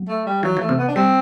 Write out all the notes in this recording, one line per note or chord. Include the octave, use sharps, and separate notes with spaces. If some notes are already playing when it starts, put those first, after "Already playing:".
Already playing: F#3
A3
G3
E3 F#3
E3
A3
C3
B3
D4
G3 C4